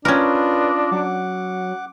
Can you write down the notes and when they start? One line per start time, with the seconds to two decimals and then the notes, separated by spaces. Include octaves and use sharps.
0.05 C#4 D4 F4 A#4 B4 D#5
0.91 F#3 F#5 D6